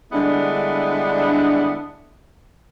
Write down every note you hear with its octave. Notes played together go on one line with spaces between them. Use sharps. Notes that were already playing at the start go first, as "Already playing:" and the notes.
D3 G3 G#3 B3 D4 E4